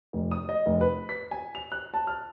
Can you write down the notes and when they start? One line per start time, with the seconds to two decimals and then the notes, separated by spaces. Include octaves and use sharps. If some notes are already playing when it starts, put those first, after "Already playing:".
0.13 F1
0.31 D#6
0.49 D#5
0.66 F1
0.81 B4
1.09 B6
1.31 G#5
1.55 F7
1.72 F#6
1.94 A5
2.07 F6